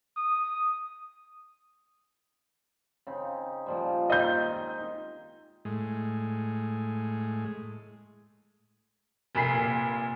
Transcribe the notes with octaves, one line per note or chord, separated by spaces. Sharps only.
D#6
C#3 C4 D#4
A#2 F3 G3
D#3 G#3 D#5 G6
A2 G#3
F1 A#2 B5 B6 C7